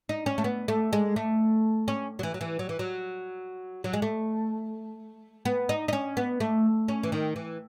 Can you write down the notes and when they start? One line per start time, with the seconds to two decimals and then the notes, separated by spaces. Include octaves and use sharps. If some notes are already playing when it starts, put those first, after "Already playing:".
0.09 D#4
0.26 C#4
0.38 A3
0.44 B3
0.68 A3
0.93 G#3
1.16 A3
1.88 C#4
2.19 F#3
2.23 E3
2.34 F#3
2.41 E3
2.59 F#3
2.69 E3
2.79 F#3
3.84 F#3
3.93 G#3
4.02 A3
5.45 B3
5.69 D#4
5.88 D#4
5.93 C#4
6.17 B3
6.40 A3
6.88 C#4
7.03 E3
7.12 D#3
7.36 E3